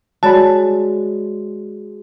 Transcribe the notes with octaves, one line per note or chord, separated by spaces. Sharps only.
G#3 F#4 C#5 D5 A5 B5